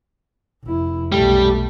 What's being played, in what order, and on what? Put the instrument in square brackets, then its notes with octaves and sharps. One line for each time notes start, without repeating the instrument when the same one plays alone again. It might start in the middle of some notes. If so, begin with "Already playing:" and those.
[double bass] F1 E4
[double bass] B1 A3 [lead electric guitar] G3